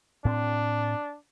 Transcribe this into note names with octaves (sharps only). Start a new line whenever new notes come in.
A2 C4 D4